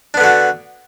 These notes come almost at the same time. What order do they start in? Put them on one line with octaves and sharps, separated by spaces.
D4 B3 D3 F#4